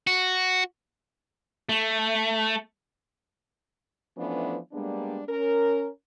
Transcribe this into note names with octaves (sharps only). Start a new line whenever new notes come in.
F#4
A3
E3 F3 A3 B3 C#4 D4
G3 G#3 A#3 B3 D4
C#4 A#4